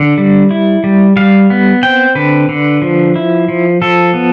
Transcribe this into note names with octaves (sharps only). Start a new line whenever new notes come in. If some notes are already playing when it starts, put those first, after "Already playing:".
Already playing: D3
G3
E4
G3
G3 F5
B3
C4 G5
D3 B4
D3
F3
E4
F3
F3 A4
B3